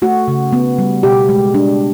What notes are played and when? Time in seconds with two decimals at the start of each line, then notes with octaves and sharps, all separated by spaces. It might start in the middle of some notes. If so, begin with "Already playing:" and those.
0.02 A3 F#4
0.28 C#3
0.53 B3
0.78 G3
1.03 B2 G4
1.29 G#3
1.54 D4